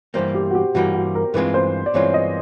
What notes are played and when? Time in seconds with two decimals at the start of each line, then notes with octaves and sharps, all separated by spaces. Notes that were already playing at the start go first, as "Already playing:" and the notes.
0.14 G2 E3 G3 A#3 C5
0.34 G4
0.51 F#4
0.55 G4
0.75 G2 E3 G3 A#3 F#4
0.94 F#4
1.15 A#4
1.34 G2 E3 G#3 C4 F4 B4
1.54 C5
1.86 D5
1.94 G2 E3 G#3 C4 F4 C#5
2.14 D#5